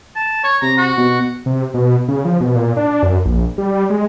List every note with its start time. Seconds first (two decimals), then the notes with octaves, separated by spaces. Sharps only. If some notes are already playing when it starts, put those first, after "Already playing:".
0.16 A5
0.44 C#5
0.62 C3 A#5
0.78 F#4
0.97 B2
1.46 C3
1.74 B2
2.08 C#3
2.25 F3
2.41 B2
2.56 A#2
2.77 D4
3.03 F#2
3.25 A#1
3.58 G3
3.90 G#3